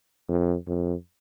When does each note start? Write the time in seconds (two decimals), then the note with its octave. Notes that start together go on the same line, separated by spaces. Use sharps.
0.29 F2
0.67 F2